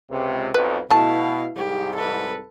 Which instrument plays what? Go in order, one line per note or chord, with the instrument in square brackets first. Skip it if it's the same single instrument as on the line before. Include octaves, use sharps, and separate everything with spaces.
[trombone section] C#2 C3
[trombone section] B1 F2 [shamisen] B4
[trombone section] B2 [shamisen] A3 A5 [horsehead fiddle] E4 F5
[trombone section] C2 G#2 [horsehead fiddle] G4
[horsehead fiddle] A4 B4